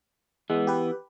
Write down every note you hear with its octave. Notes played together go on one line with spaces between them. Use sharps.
E3 G#3 B3
G4 B4